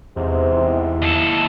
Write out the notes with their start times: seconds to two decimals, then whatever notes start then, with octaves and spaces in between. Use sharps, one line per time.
0.16 E2 G#2 C3 E3
0.56 E4
1.02 D#2 A4